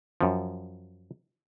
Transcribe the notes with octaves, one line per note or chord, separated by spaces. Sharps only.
F#2 F3